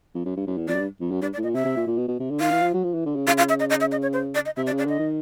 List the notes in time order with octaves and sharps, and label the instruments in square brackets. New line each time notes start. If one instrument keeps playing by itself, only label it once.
[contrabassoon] F2
F#2
G2
F#2
E2
[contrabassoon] F2 [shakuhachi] D5
[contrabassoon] F#2
G2
F2
F#2
[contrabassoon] G2 [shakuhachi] D5
[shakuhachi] D5
[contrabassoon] A2
[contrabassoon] A#2 [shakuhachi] D#5
[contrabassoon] C3 [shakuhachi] E5
[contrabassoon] C3
A#2
A#2
B2
B2
C3
D3
[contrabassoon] D#3 [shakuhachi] F5
[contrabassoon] E3
F3
F#3
F3
E3
D3
C#3
[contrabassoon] C#3 [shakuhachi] F5
[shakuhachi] F5
E5
D#5
D#5
E5
D#5
C#5
C5
D5
D#5
[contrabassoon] C3 [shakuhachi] E5
[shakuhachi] D5
[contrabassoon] C#3
[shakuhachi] D5
[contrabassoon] D3 [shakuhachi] D#5
[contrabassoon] D#3